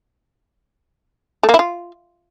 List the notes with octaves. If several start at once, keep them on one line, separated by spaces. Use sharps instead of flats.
A3
A#3
E4
F4